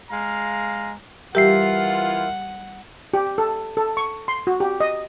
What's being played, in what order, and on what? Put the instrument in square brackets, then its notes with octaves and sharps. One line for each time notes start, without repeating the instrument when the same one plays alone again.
[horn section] G#3 F5 A#5
[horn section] E3 F4 [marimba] G3 G4 [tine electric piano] A#4 E5 C7 [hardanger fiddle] F#5
[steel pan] G4
A4
A4
C#6
C6
F#4
G4
D#5